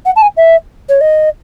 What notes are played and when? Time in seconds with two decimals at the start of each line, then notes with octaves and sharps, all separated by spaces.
0.06 F#5
0.16 A5
0.22 G#5
0.37 E5
0.89 C#5
1.01 D#5